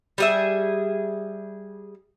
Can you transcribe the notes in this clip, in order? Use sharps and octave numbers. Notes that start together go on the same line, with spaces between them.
G3 G#4 E5